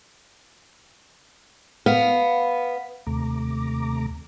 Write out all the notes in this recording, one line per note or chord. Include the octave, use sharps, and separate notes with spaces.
B3 F5
D#2 C3 A3 A#5 D6